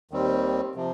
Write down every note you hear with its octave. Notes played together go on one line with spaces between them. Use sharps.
D#2 D#3 G3 C4
C3 F3